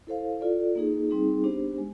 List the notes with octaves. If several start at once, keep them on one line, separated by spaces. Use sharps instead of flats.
E4 A4 C5 F5
F4 A4 D5
A#3 D#4 G#4
G3 C4 D#4 G#4
B3 D4 G4 C5
G#3